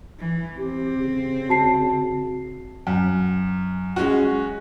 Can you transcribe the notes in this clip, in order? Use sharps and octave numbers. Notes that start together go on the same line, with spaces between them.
E3
C4 G4
C#3
F#4 A5 C7
F#2
G#3 C#4 F#4